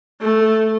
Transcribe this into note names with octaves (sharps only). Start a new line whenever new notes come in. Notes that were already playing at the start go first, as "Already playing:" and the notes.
A3